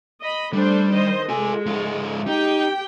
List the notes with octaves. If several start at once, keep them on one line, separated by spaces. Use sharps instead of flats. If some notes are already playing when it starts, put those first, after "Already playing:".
D#5 B5
G3 A3 D4 C5
D#3 C5 D#5
G#3 F4 A4 G#5
G#2 F4
D#4 G4 G5